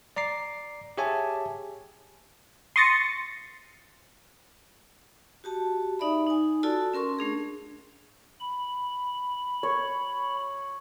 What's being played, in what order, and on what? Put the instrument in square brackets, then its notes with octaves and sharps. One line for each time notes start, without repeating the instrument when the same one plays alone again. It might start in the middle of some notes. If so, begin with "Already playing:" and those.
[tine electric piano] D5 A#5 D6 C7
G4 G#4 C#5 E5 G#5 A5
[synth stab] C6 C#6 D#6 A6 A#6 C#7
[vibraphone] F#4 G4 A5
D#4 D5 E5 B5
D#4 G#5
F4 F#4 A4 D5 A5 E6
C#4 A#4 C6 C#6
A3 D4 G#4
[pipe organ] B5
[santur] C#5